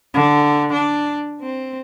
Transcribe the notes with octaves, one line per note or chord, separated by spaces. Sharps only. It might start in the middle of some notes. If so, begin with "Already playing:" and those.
D3
D4
C4